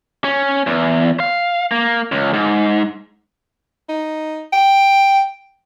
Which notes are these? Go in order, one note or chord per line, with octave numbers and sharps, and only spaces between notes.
C#4
E2
F5
A#3
C#2
G#2
D#4
G5